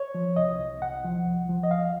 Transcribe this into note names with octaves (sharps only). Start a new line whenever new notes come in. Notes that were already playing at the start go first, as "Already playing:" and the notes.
Already playing: C#5
F3
C2 D#5
C2
C2 F#5
F3
C2
F3
D#5
C2 F5